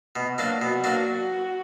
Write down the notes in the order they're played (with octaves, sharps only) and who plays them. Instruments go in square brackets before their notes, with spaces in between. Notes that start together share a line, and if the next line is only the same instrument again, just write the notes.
[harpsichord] B2
F#3 A#3 D4
[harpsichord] B2 [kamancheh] F#4
[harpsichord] F#3 A#3 D4